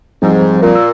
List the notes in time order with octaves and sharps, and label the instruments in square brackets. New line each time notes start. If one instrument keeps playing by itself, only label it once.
[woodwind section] G#2 [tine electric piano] F3 G3 C4
[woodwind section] A#2
[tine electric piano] E6